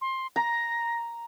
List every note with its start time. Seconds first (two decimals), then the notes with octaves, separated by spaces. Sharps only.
0.01 C6
0.36 A#5 A#6